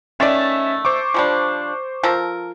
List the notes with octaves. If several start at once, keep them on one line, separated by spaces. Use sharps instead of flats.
D#3 A3 C#4 D5 E5 A6
C5 C#6 D6
F3 G3 D4
F3 A4 A#4